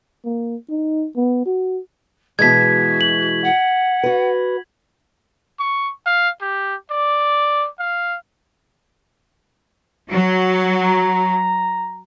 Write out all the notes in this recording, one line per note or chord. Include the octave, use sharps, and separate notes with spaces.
A#3
D#4
B3
F#4
B2 E3 G#3 F#4 G#6 B6
F#7
F#5
F#4 B4
C#6
F5
G4
D5
F5
F#3
A#5